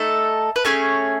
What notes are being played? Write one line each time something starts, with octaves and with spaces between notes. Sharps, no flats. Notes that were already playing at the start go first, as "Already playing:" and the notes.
Already playing: A3 D#4 A4
B4
A3 C#4 G#4 C#5